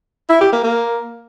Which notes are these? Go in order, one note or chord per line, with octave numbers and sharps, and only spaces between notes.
E4
G4
A#3
A#3